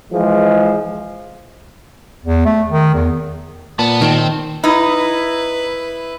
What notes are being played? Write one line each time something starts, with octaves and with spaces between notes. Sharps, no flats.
E3 F3 G#3
E2
A3
D#3
E2
A#2 B3 A5
D#3 C4
D#4 E4 B4